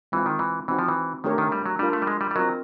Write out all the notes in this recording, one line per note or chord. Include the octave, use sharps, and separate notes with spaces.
E3 G#3 C4 F4
D#3
E3
E3 C4 D#4 F#4
F3
E3
D#3 A3 D4 G4 A#4 C#5
D#3
G3
F#3
G3 D4 F4 A#4
A3
G3
G#3
G3
G3
F#3 C4 F4 A#4 D#5